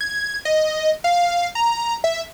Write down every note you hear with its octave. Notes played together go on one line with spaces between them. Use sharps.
G#6
D#5
F5
A#5
E5